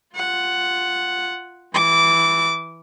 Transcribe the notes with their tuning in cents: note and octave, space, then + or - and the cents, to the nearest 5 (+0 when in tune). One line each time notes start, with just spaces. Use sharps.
F4 +5 F#5 +0
E3 +0 D6 -20